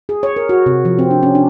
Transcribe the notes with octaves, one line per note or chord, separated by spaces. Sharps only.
G#4
C#5
A#4
F#4
C3
F3
C4
D4
C#4
D4